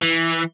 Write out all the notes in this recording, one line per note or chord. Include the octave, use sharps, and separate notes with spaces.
E3